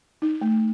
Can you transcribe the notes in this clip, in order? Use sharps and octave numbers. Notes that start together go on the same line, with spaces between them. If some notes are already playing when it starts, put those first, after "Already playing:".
D#4
A3